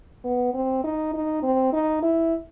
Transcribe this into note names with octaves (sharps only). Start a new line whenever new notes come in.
B3
C4
D#4
D#4
C4
D#4
E4